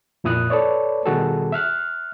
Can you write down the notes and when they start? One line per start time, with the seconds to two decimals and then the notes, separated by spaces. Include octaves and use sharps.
0.24 F2 A#2 E4 D#6 F#6
0.50 A4 B4 C#5 D5
1.06 B2 D#3 G3 F#4 G#4 A4
1.52 E5 F6 F#6